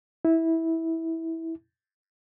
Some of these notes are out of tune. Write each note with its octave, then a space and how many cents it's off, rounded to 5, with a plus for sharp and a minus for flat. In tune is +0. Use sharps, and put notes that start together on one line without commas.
E4 -15